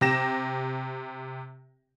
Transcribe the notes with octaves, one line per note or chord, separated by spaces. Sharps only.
C3 G4 A#6 E7